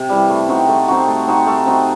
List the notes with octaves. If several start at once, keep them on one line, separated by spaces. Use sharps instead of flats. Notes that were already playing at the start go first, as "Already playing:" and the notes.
Already playing: C3
E3 G3
A3
C4 D#4 F#4
A3
C4 D#4 F#4
A3
C4 D#4 F#4
A3
C4 D#4 F#4